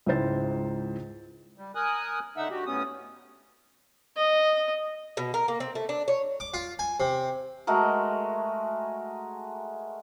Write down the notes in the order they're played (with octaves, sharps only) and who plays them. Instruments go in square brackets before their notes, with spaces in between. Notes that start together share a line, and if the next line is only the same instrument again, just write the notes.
[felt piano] C#2 G#2 E4 C5 A6
[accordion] G3
A#4 G#5 D#6 F#6
D2 D3 D#4 E5 F#5 E6
D3 F#4 G4
A2 B3 C#4 D#6
[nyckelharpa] D#5
[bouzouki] B2
A#4
A#3
C4
A3
D4
C#5
[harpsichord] D6
F4
G#5
C3
[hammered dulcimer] G#3 A3 F#4 A#4